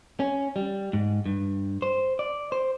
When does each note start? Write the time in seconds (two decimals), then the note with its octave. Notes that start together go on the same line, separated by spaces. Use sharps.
0.20 C#4
0.56 G3
0.93 G#2
1.26 G2
1.82 C5
2.19 D5
2.52 C5